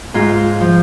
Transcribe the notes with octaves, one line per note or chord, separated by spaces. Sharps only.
G#2 F4
F3